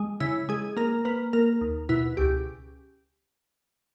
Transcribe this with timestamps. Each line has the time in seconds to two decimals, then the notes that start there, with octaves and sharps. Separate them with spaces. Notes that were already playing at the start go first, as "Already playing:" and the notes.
Already playing: G#3
0.20 C#3 E4
0.49 G#3 G#4
0.77 A#3 A#4
1.05 A#3 B4
1.33 A#3 A#4
1.61 D#2
1.89 B2 E4
2.17 C#2 G4